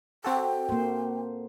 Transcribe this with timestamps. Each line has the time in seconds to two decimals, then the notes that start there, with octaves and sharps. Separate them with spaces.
0.24 C4 F#4 A4 G5
0.69 A#3 C5